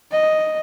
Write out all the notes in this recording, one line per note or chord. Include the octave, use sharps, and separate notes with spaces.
D#5